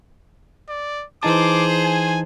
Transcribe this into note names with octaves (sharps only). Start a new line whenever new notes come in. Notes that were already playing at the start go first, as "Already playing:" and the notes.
D5
E3 D#4 G#4 C5 A5 D6
G#5